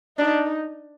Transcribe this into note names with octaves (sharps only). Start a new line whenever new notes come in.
D4 D#4